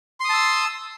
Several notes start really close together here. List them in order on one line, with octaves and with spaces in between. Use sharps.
C6 D#6 A5 E6